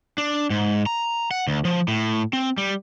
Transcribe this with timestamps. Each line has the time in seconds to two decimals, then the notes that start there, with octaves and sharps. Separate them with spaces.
0.18 D4
0.50 G#2
0.86 A#5
1.31 F#5
1.47 D2
1.65 F3
1.88 A2
2.33 C4
2.58 G3